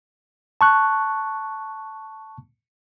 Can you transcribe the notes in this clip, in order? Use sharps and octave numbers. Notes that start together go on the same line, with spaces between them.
A5 C#6 F#6